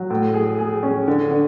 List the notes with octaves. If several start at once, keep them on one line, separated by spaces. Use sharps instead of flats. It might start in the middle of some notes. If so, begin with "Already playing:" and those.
Already playing: F#3
A2
G#4
G#4
C#4
D3
D3